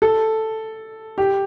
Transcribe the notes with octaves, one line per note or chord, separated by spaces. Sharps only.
A4
G4